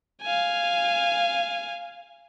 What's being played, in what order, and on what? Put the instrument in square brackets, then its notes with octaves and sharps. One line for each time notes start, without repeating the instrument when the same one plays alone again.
[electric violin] F5 G#5